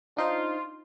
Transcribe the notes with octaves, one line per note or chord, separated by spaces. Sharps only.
D4 D#4 F4 C5